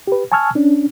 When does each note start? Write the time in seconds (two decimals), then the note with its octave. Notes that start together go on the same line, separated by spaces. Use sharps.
0.07 G4 B4
0.32 G#5 A5 C#6 E6 F6 G#6
0.55 C#4 D4